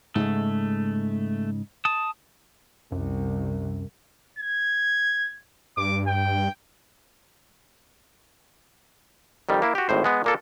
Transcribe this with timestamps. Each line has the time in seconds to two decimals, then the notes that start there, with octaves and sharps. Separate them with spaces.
0.15 G#2 C#3 G#3 A3
1.85 A5 D#6
2.92 C2 F#2
4.39 G#6
5.77 G2 D6
6.07 G5
9.49 F2 D#3 G3
9.62 A#3 E4
9.75 F#4 G4
9.89 G#1 A2 C5
10.04 G#3 B3
10.24 A#2 A#3 A4